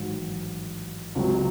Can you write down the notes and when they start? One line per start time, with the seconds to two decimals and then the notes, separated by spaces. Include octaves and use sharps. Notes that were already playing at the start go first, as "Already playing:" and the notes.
Already playing: A1 G#2 D#3 F#3
1.15 C#2 C3 F#3